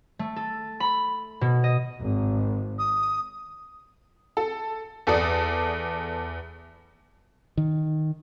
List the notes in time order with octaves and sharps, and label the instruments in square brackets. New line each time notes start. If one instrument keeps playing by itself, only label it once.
[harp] A3
A4
B5
B2
D#5
[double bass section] G#1
[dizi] D#6
[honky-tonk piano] A4
E2 A4 D5 D#6
[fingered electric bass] D#3